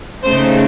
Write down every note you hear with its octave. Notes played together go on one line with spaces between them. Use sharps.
C#3 A3 D#4 C5